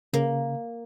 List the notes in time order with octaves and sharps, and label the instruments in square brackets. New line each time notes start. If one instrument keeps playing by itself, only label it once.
[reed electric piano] C#3 [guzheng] A#3